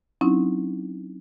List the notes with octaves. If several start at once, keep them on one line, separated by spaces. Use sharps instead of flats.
F#3 C4 C#4 D#4 E4